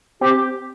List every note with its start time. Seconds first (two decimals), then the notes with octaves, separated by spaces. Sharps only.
0.21 C4 G4